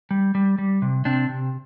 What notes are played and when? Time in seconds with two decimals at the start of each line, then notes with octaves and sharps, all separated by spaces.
0.11 G3
0.35 G3
0.58 G3
0.82 C3
1.05 C3 C4 D4
1.29 C3